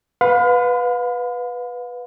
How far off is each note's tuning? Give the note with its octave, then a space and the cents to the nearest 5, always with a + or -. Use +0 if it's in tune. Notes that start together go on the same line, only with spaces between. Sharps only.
B4 +0 F5 +40 B5 +40